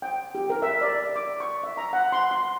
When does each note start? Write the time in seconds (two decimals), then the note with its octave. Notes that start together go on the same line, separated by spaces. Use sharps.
0.02 G5
0.35 G4
0.50 A#4
0.62 E5
0.81 D5
1.16 D6
1.40 C#6
1.64 E5
1.77 A#5
1.93 F#5
2.12 C6
2.31 C6